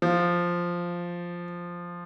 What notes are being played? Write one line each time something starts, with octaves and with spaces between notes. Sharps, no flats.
F3